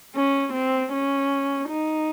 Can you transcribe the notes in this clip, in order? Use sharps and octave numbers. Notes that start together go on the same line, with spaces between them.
C#4
C4
C#4
D#4